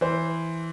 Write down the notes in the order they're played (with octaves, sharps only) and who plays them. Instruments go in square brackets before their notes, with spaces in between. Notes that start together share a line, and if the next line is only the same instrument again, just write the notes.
[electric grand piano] E3 [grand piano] C5